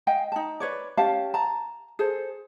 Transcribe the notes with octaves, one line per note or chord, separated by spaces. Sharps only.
D#5 F5 G5 G#5
D#4 A5
B4 C#5 D5
C#4 G4 F5 A5
A5 A#5
G#4 A4 C5